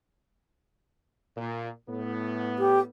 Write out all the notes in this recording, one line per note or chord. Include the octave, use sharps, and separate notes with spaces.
A#2
A2 B3
G4